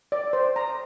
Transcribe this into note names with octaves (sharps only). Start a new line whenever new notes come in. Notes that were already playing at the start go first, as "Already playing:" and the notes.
D5
C5
A#5